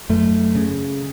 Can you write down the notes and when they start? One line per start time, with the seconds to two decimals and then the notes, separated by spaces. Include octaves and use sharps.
0.10 F#2 A3
0.55 C#3